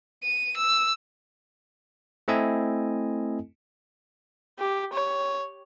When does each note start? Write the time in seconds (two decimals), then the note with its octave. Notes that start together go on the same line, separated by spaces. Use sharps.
0.23 D#7
0.57 E6
2.28 A3 C4 E4 A4 D#5 G#5
4.59 G4
4.93 C#5